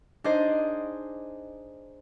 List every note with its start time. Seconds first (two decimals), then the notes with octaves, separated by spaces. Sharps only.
0.24 D4 D#4 G#4 C5 D#5